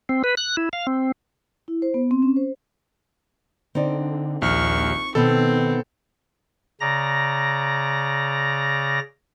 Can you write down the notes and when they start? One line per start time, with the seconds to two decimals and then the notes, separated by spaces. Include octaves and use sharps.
0.09 C4
0.24 B4
0.37 F#6
0.57 E4
0.73 F5
0.87 C4
1.68 E4
1.82 C5
1.94 B3
2.11 C4
2.22 C#4
2.36 C5
3.75 D3 C4 D#4 D5
4.42 A#1 D#2 C#6 F6
5.15 B2 D#3 B3 C4 A4
6.80 C#3 D5 A#5 A#6